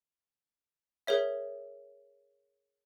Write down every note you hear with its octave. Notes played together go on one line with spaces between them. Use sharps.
G#4 A#4 C#5 E5